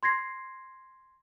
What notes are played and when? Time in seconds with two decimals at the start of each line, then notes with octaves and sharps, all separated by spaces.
0.03 C6 G#6 A#6 C7